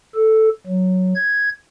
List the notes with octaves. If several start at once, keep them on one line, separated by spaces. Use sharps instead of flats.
A4
F#3
G#6